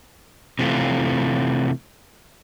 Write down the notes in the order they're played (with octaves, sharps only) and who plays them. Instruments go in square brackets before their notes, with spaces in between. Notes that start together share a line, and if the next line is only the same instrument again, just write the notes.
[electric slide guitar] C3 E3 A3 F4